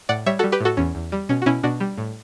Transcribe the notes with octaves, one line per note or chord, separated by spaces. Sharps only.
A2 D5 F#5
G3 C#5 E5
G3 F#4 A4
G4 B4
A2 F#4 A4
E2 C#4
E2
G3
B2 C#4
F#4
B2 C#4 E4
B2 D4 F#4
G3
A2